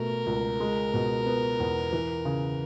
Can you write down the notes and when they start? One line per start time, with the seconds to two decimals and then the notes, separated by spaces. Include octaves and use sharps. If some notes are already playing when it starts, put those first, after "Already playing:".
Already playing: B2 A3 A#4
0.26 C#2
0.60 G#3
0.94 B2
1.26 B3
1.60 E2
1.93 E3
2.25 C#3